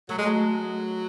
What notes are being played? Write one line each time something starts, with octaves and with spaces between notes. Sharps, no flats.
F#3 A3
G#3
F#3